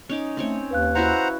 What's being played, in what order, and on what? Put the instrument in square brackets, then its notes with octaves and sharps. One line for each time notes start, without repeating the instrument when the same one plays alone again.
[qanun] C#4 D#4 D6
[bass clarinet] A3 [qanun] C4 C#4 C#5
[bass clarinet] D#2 [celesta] B4 F5 F#6
[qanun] C#4 E4 F#4 [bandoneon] C5 F#5 A#5